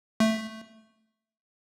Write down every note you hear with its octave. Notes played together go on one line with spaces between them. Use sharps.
A3